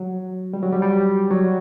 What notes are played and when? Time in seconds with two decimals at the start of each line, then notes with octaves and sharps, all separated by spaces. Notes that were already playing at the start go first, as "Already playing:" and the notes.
Already playing: F#3
0.53 G3
0.63 F#3
0.72 G3
0.82 G3
1.31 F#3